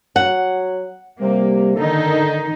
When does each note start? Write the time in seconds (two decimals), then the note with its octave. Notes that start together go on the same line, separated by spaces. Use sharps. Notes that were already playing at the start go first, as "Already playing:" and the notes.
0.16 F#3 F#5
1.21 C3 G3 A#3
1.76 D3 D#3 D#4 A4